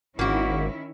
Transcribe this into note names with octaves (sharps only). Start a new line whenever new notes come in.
G#1 D#3 A#3 C#4 E4 F#4